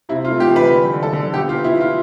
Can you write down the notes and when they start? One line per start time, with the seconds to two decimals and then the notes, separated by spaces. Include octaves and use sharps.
0.09 C3 E4
0.24 F4
0.30 A3
0.40 G4
0.50 E3
0.56 B4
0.71 D3
0.92 D3
1.02 A4
1.13 D3
1.33 B2 G4
1.49 F4
1.54 B3
1.64 E4
1.75 B3
1.80 F4